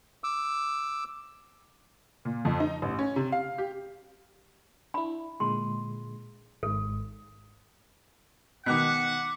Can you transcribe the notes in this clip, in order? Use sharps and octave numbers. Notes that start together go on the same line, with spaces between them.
D6 E6
A#2
F2
D#4
A1
C#4
C3
F5
G4
D4 E4 B5
A#2 D3 G#3 C6
G#1 G#2 A4
B2 D#3 F#5 D6 F#6 B6